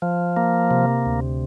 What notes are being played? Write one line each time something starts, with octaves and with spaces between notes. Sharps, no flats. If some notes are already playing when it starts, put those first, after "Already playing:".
F3
A#3
C3
D2